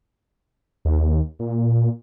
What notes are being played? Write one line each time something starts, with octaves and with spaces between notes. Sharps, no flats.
D#2
A#2